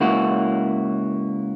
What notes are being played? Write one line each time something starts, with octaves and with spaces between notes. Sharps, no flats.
C#2 A#3 E4 F#4